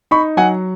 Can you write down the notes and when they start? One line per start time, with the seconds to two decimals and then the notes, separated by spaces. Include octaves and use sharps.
0.11 D#4 B5 C#6
0.37 F#3 F#5 G#5